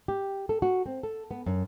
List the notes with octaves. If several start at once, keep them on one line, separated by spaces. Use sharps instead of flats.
G4
A4
F#4
C4
A4
B3
F#2